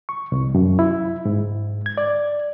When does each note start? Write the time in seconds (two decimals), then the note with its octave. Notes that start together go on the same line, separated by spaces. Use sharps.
0.09 C#6
0.32 C2
0.55 F#2
0.79 E4
1.25 G#2
1.86 G#6
1.98 D5